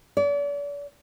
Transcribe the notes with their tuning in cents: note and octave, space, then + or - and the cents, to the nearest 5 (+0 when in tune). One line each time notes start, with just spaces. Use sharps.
D5 -40